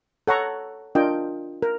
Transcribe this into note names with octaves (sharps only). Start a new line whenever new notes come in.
A4 C#5 F#5 A#5 C#6
D4 F4 A#4 D#5 G5
A#4